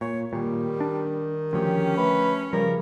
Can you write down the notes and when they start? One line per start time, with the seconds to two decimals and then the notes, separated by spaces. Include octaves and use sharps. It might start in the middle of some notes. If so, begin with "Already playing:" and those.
0.01 A#2 C#5
0.33 A#2 D#3 G3
0.80 D4
1.53 D2 F3 C#4 G4
1.98 A3 B4
2.53 C#3 F3 G3 A#4